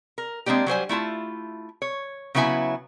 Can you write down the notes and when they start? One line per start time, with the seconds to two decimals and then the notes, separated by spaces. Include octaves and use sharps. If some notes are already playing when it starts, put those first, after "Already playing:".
0.18 A#4
0.46 G#3 A#3 C4 D4 G4
0.66 F#3 G3 C5 G#5
0.89 A3 E4 F4 A5
1.82 C#5
2.35 C#3 F#3 B3 E4 E5 G#5